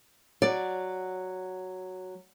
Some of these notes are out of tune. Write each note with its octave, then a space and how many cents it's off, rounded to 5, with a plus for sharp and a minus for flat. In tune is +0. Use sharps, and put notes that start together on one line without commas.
F#3 +0 D5 +0